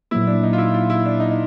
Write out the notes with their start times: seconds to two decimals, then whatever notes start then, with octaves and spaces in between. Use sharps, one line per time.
0.11 A#2 F#3 A#3 E4
0.27 D4
0.43 D#4
0.53 F4
0.58 E4
0.74 F4
0.90 E4
1.06 D4
1.20 D#4